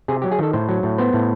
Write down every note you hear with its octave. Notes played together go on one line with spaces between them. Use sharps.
C3 G#4
F#3 G4
G#4
D#3 A4
A2 C5
F#3
A2
B3 C5
A2